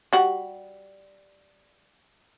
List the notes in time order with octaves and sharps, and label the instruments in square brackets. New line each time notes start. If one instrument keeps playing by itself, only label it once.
[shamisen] G3 F#4